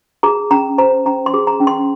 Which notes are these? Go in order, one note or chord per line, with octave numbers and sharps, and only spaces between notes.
G#4 A#5
C#4 A#5
C5 A#5
C#4 A#5
C6
G#4
A#5
C#4
C6